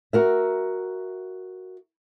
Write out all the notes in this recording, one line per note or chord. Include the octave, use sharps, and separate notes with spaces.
F#4 A#4 E5